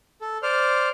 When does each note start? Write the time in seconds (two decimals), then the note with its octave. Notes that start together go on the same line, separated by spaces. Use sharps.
0.21 A4
0.43 C5 D5 F6